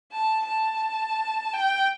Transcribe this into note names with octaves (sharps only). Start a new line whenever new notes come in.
A5
A5
G5